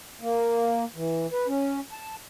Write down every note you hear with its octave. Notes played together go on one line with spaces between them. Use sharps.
A#3
E3
B4
C#4
A5